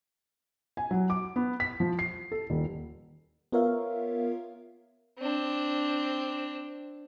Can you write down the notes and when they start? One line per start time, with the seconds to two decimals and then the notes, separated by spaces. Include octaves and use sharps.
0.77 G#5
0.91 F#3
1.10 D6
1.36 B3
1.60 B6
1.80 F3
1.99 C7
2.32 A4
2.50 D#1
3.52 B3 F4 A#4 C#5 E5 F5
5.19 C4 D4